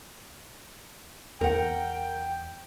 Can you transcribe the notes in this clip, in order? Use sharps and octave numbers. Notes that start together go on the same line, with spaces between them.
E2 A#4 F#5 G5